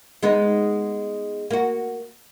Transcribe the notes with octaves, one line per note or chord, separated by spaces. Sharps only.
G#3 B3 D#4
A#3 F#4